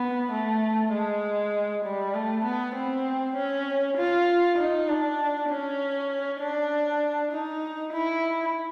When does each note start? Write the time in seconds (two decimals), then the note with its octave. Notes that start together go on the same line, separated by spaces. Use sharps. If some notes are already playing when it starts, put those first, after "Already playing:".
Already playing: B3
0.32 A3
0.93 G#3
1.85 G3
2.15 A3
2.45 B3
2.75 C4
3.36 C#4
3.97 F4
4.58 D#4
4.89 D4
5.49 C#4
6.40 D4
7.32 D#4
7.93 E4